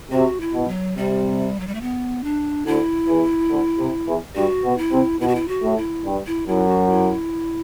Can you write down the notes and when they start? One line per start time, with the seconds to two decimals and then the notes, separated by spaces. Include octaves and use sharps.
0.12 C3 F#4
0.40 E4
0.54 B2
0.68 F#3
0.97 C3 G3
1.60 F#3
1.67 G3
1.74 A3
1.81 B3
2.24 D4
2.66 D2 D3 E4
3.08 E2 E3
3.51 D2 D3
3.79 C3
4.08 E2 E3
4.36 G2 G3 F#4
4.64 B2 B3
4.78 E4
4.92 C3 C4
5.21 B2 B3 E4
5.28 F#4
5.35 E4
5.48 F#4
5.63 A2 A3
5.77 E4
6.05 G2 G3
6.27 E4
6.48 F#2 F#3 E4
6.68 F#4
6.90 E4